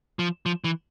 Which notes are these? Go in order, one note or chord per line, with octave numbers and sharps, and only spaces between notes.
F3
F3
E3